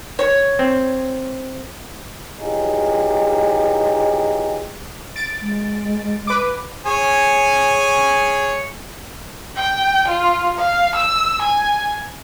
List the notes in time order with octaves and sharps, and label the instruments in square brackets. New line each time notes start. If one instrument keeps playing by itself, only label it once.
[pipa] C#5
[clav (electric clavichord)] C4
[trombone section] E3 F#3 D#4 F4 G4 G#4
[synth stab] A6 D7
[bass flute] G#3
[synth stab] B4 D6
[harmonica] G#4 C#5 G#5
[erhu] G5
F4
F5
E6
G#5